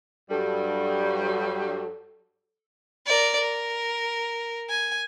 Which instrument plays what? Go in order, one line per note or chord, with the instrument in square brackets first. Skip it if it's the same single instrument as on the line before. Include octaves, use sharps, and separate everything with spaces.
[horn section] G2 F#3 G3 [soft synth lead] A4
[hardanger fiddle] A#4 D5
A#4
G#5